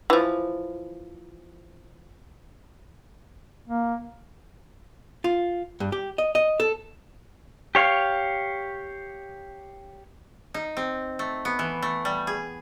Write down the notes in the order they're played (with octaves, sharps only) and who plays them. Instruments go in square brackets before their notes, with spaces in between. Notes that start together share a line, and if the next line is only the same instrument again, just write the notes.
[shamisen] E3 F3
[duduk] A#3
[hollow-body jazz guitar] F4
G2
G4
D#5
D#5
A4
[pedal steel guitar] G4 C#5 F5
[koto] D#4
C4
A3
B3
E3
A3
G3
G#4